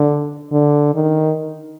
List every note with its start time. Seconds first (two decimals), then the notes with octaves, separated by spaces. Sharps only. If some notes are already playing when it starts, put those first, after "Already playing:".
Already playing: D3
0.52 D3
0.94 D#3